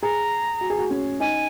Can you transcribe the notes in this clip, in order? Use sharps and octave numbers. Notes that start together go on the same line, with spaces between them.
G#4 A#5
F#4
G#4
F#4
C#4
D#4 G#5